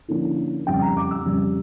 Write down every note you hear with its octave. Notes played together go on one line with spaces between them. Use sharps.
D3 F3 A#3 C#4 E4
F2 C#3 G3 G5
A#5
D6
E6
F2 C#3 G3